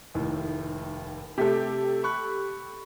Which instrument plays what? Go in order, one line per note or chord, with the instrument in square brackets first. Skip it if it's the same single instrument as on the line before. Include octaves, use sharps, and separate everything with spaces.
[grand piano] F1 D#2 A2
[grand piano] C3 A3 [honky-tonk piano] G4 A4
[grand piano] B5 C#6 F#6